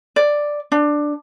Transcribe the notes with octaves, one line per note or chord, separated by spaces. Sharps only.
D5
D4